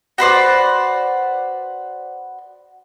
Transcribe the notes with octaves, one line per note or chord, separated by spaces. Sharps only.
F#4 B4 C5 D5